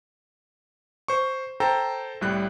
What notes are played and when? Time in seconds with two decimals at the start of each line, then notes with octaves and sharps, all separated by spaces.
1.08 C5 C#6
1.60 A4 C5 G5 A#5
2.21 C2 A2 G3 F#6